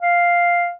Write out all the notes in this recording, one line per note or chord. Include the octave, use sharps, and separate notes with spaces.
F5